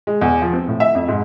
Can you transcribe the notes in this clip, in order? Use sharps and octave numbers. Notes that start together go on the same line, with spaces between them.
G#3
E2
F3
C4
A2
E5
F2
G#2